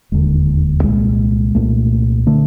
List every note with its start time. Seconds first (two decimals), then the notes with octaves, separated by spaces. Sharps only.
0.12 E1 D#2 D3 G#3
0.83 C2 A#2 G#3
1.55 C2 A#2 A3
2.26 D3 A3